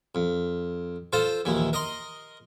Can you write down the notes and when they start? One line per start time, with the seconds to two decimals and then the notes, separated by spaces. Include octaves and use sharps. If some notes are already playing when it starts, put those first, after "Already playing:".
0.15 F2
1.13 F4 A4 C5
1.45 A#1 D#2 E3
1.73 A#4 D#5 C6